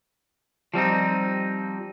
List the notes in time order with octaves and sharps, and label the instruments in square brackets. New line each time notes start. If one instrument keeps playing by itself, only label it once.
[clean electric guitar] F3 G3 C4 D#4